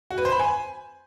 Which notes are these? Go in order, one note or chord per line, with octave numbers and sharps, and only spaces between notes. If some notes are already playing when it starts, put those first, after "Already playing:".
F#4
B4
C5
B5
G#5